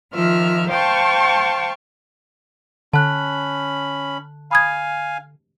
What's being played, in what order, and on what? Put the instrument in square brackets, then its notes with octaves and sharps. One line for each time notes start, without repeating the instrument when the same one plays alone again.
[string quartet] D#3 F3 F4 E5 F6
C5 F5 G5 A5 C#6
[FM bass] D3 [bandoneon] C#4 B5 [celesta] A5 F#6
[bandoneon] F5 G#5 [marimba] B5 D#6 G#6